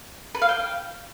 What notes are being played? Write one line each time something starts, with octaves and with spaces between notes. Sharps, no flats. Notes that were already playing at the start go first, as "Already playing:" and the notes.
B4
F5
G5